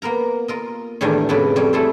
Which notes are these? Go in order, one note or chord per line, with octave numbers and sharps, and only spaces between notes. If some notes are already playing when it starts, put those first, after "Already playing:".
A#3 B3 A#4 A#5
F4 A#4 D#5
E2 A2 D#3 G3 D4 G#5
F2 A2 C#3 E4 B4 D5
F2 G3 C#5
A3 E4 G#4 A4 C5